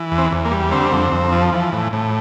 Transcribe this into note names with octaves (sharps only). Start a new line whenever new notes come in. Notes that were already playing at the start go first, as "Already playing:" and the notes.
Already playing: E3
E2
C4
E2
A#3
G3
D3 C4
F2
F2
F3
E3
A2
A2